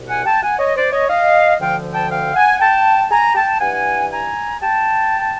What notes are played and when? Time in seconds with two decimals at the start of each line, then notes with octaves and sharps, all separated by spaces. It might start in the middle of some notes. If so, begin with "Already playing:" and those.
Already playing: C2 B2
0.09 F#5 G#5
0.25 G5 A5
0.42 F#5 G#5
0.59 C#5 D#5
0.76 C5 D5
0.92 C#5 D#5
1.09 D#5 F5
1.60 D2 D3 F3 F5 G5
1.93 G5 A5
2.10 F5 G5
2.35 F#5 G#5
2.60 G5 A5
3.11 G#5 A#5
3.35 G5 A5
3.60 G2 E3 F#5 G#5
4.11 G#5 A#5
4.61 G5 A5